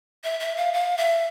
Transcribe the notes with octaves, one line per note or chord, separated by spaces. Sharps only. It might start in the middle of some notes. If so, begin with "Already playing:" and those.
E5
E5
F5
F5
E5